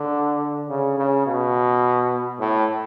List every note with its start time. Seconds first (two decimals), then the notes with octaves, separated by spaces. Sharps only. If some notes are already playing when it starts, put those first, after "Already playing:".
Already playing: D3
0.69 C#3
0.98 C#3
1.27 B2
2.39 A2